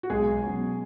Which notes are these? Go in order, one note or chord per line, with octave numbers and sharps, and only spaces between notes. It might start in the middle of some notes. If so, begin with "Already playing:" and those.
F#4
B1 G#3 G#4
B2 F#3 C#4